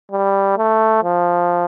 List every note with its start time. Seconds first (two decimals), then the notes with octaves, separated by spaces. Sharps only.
0.12 G3
0.58 A3
1.03 F3